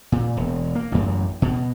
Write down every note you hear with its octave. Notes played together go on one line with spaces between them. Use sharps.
A#2
E1
A#3
A1 F#2
B2